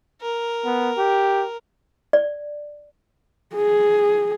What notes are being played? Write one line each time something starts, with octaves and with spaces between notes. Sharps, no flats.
A#4
B3
G4
D5
G#4